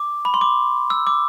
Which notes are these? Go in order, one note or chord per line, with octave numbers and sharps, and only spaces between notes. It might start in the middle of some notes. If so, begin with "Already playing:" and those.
Already playing: D6
B5
C6
D6
E6
D6